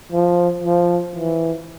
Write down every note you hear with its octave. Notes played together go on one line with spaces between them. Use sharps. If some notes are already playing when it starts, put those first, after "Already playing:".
F3
F3
E3